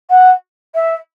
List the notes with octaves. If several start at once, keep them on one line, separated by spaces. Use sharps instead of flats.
F#5
E5